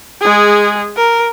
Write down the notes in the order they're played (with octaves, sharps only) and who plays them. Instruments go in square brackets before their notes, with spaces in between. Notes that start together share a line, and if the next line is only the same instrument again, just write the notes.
[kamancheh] G#3 G#4
A#4